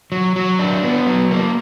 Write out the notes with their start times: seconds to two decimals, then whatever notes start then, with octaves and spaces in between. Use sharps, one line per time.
0.12 F#3
0.36 F#3
0.59 D4
0.83 B3
1.06 F#3
1.31 A#3